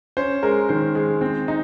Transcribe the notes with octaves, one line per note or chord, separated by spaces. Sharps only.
C#4 C5
G#3 A#4
D#3 C5
G#3
C4
D#4